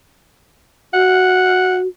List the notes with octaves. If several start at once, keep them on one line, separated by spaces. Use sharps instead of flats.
F#4 F#5